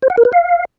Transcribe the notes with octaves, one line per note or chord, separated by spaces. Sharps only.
C5
F#5
A#4
B4
F5